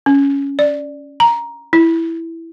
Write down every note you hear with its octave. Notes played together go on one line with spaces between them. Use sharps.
C#4
D5
A#5
E4